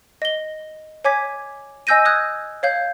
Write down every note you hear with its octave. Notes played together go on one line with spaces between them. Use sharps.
D#5 G7
C#5 G#5 D6 G#6 B6
D#5 G#5 E6 G6 A#6 D#7
D#6 F#6 G#6
C#5 F5 G6